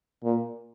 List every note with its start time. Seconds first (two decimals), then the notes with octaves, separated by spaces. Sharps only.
0.24 A#2